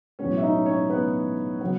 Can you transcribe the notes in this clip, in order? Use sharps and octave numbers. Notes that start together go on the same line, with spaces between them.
B1 A2 E3 G#3 B3 C#4 C#5
E5
D#4 D#5
C#4 C#5
B3 B4
C#3 F#3 B3